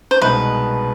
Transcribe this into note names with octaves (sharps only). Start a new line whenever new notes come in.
C5
C2 B2 G#3 B3 D#4 B4